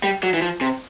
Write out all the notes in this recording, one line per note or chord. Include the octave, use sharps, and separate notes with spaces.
G3
F#3
E3
F3
C3